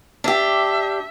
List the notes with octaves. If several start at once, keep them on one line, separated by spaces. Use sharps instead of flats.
D4 G4 E5